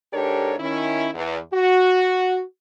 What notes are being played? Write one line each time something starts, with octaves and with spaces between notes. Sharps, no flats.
G#2 D4 G4 A4 A#4 C#5
D#3 C#4 E4
E2
F#4